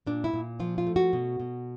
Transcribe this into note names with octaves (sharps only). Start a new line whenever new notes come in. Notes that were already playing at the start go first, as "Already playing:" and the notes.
A#2 D4
E4
A#2
F3 F4
F4
A3
F#4
B2
B2